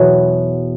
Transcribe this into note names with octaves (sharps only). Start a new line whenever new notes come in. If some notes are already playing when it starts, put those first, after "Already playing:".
Already playing: E2 B2 F#3